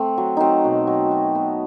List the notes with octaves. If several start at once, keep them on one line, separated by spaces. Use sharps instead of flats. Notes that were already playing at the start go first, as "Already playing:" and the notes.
Already playing: A3 C4
F#3
F#3 C4 D#4
B2
F#3
F#3
B3